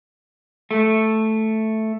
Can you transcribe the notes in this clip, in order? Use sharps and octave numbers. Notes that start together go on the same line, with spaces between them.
A3